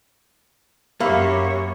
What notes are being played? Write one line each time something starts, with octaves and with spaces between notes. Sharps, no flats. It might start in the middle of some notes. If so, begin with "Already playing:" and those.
F#2 A#3 G4 C#5 E5 B5 C6